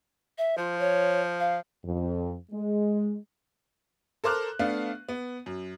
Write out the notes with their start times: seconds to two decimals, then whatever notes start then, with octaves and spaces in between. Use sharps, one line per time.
0.38 E5
0.58 F3 F4
0.79 C#5
1.40 F5
1.85 F2
2.52 G#3
4.24 A4 A#4 C5 D6 F6 F#6
4.59 A3 B3 D4 F5
5.09 B3
5.46 F#2